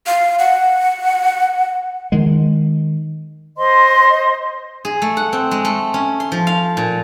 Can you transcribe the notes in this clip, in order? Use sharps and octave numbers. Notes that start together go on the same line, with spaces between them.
F5
F#5
D#3 G#3
C5 D#5 C6
G#4
A3
F#5
C4
G#3
A3
C#4
C6
F3
F5
A#2